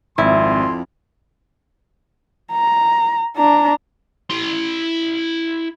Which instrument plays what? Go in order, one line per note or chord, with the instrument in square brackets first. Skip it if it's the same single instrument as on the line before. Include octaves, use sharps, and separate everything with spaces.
[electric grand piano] G#1 [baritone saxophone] F2 [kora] E4 [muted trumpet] C6
[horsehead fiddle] A#5
D4 A#5
[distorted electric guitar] E4 C6